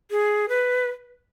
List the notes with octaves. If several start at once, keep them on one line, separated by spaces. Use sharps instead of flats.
G#4
B4